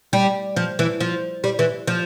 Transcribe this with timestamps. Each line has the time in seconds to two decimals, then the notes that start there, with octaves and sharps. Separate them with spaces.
0.13 G3
0.56 F3
0.79 E3
1.00 F3
1.44 G3
1.59 E3
1.87 F3